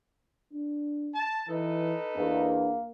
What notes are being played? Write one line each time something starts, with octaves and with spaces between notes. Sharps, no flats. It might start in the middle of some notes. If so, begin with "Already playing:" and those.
D4
A5
E3 D#4 A4 B4
E2 A#3 D4